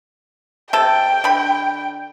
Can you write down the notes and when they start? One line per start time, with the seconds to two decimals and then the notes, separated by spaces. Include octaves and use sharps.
0.73 C3 A4 G5
1.24 D3 B5